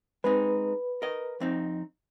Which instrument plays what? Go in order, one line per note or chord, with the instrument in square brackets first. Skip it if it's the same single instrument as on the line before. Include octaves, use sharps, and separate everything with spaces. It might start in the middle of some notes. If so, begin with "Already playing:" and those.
[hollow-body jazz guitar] G#3 C4 D#4 [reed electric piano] B4
[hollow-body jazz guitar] A#4 D#5
F2 C4 D#4